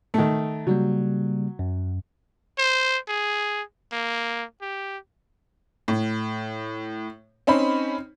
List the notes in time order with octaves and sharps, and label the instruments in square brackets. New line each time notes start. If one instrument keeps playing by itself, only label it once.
[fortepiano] D#3 A3
[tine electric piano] C#3 G3 A#3 [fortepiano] F#3
[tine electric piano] F#2
[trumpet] C5
G#4
A#3
G4
[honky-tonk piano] A2
C4 C#4 D#4 C5 B5